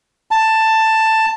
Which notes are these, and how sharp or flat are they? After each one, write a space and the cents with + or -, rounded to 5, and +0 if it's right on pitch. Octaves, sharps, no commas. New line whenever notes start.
A5 +10